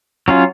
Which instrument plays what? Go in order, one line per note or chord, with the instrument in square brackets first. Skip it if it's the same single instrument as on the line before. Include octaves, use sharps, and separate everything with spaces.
[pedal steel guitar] F#3 C#4 F4